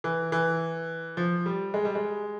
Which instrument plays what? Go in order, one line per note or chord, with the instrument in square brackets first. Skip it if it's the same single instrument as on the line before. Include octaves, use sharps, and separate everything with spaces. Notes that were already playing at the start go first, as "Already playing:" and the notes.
[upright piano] E3
E3
F3
G3
G#3
G3
G#3